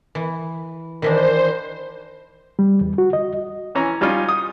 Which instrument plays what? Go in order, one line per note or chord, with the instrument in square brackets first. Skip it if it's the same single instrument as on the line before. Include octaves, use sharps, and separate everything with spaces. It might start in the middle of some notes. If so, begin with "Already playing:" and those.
[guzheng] E3
[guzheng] D#3 E3 D4 [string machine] C5
[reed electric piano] G3
E2
F#4
D#5
[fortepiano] E3 C#4 A#5
G3 C#4 D#4 F4
D#6